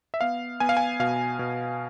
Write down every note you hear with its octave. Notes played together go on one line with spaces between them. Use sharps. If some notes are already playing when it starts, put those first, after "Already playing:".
E5
B3 F5
B3 G#5
F5
G#5
B2 F5
B2